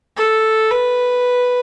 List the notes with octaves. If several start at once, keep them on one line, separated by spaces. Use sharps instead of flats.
A4
B4